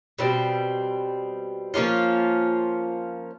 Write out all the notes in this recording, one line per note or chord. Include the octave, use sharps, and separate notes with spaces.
B2 G3 C4
F3 A#3 C#4 F4